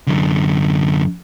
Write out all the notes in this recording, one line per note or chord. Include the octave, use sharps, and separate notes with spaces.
F#2 D3